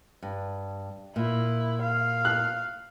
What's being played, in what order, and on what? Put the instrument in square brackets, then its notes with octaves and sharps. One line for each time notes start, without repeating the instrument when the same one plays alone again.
[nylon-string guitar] G2
[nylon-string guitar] A#2 [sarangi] E4
[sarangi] F5
[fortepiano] F#6